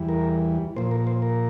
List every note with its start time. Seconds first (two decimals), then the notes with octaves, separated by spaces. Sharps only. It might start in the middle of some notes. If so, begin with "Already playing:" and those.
Already playing: E2 E3 G3
0.09 A#4
0.76 A#2 F3 C5
0.91 A#4
1.07 C5
1.22 A#4